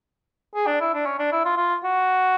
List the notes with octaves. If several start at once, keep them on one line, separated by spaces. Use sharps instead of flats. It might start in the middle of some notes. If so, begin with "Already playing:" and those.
G#4
D4
E4
D4
C#4
D4
E4
F4
F4
F#4